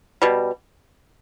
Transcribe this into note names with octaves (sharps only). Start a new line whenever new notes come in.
B2 G3